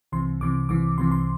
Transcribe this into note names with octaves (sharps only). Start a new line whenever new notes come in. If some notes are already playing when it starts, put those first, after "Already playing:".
C2 C3 E3 C6
C2 C3 E3 D6
C2 C3 E3 D6
C2 C3 E3 C6
C6